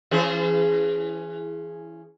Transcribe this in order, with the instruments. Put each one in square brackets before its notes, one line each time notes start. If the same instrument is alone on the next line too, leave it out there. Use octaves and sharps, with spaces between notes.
[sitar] E3 C#4 G#4